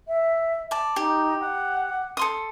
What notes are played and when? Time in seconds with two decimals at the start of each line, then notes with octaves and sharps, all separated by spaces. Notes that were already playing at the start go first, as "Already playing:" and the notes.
0.08 E5
0.71 D5 A5
0.96 D#4 G4
1.40 F#5
2.17 A4 C6 D#6